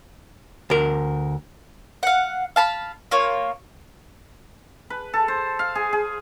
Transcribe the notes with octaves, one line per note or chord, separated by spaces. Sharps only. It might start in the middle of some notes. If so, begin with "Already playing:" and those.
D2 A#4
F5 F#5
F5 A5 B5
A#3 F4 C#5
B4
A4
C5
F5
G#4
G#4